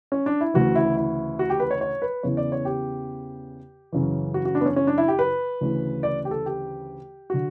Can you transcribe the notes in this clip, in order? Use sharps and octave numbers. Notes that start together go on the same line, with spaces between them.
C#4
D4
E4
D2 C#3 E3 F#4
E4
E4
F#4
G4
B4
C#5
C#5
B4
E2 C#3 E3 C#5
D5
C#5
G4
F#2 C#3 E3
F#4
F#4
D4
B3
C#4
C#4
D4
E4
G4
B4
D2 C#3 E3
D5
G4
A4
G4
D3 F#4